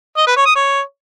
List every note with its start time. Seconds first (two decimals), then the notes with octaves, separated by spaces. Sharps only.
0.17 D#5
0.27 B4
0.37 C#5
0.46 D#6
0.56 C#5